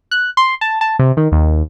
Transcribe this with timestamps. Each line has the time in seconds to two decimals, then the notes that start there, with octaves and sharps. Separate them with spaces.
0.11 F#6
0.37 C6
0.61 A5
0.81 A5
0.99 C3
1.17 D#3
1.32 D#2